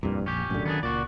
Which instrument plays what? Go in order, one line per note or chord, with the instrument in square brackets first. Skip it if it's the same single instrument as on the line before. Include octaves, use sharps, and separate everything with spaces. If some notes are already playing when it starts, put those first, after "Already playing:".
[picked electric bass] F1 [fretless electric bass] C2 G2 [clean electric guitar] A#2
[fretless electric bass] A#1 [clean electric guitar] C#4 G4
[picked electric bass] D1 B1 A2 [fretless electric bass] F#2 D3
[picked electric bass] D#3 [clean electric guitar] B3 D4 G#4
[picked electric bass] C#2 [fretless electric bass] A#2 [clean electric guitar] F#4 D5